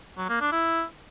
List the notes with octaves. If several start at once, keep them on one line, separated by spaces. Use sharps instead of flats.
F#3
A#3
D4
E4